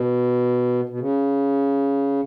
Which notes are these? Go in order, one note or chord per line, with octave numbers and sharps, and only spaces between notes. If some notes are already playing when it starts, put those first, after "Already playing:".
Already playing: B2
B2
C#3